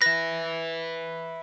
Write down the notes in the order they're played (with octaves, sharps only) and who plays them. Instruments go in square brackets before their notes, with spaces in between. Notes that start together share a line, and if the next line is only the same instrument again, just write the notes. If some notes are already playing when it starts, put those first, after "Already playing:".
[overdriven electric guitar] B4 E5 [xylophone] A#6